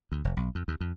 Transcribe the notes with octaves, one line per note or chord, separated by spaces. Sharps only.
D2
F1
B1
F2
D#2
F2